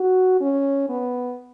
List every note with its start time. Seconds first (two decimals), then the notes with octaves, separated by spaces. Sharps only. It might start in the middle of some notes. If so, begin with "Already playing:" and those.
Already playing: F#4
0.41 C#4
0.89 B3